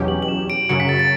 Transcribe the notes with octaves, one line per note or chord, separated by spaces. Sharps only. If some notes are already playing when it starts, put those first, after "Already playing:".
Already playing: E2 B2 F#3 C#4 G4
F#7
F#7
E7
D7
F#2 C#3 F#3 C#7
B6
A6
A6